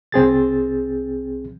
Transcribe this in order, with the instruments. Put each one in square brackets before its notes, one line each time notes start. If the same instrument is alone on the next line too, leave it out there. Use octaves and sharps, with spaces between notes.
[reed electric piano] C2 C4 G#4 A6